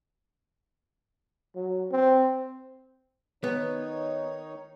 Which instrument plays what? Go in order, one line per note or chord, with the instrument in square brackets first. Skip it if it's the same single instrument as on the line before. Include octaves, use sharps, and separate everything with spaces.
[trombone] F#3
C4
[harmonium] D#3 D#4 C#5 [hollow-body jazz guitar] B3